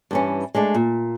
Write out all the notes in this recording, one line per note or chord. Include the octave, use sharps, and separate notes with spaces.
G2 E3 C#4
G#3 A3 D4
A#2